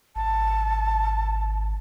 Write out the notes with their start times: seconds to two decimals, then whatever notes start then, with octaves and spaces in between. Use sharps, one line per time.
0.16 G#1 A5